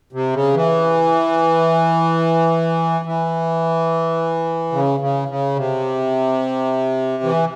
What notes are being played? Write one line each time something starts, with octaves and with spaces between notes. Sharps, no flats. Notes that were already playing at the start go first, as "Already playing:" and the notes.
C3
C#3
E3
E3
C#3
C#3
C#3
C3
E3